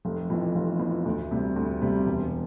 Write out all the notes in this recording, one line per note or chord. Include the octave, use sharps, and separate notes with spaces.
F1
F2 E3
F1
F2 E3
D2
C3 G3
D2
C3 G3
E1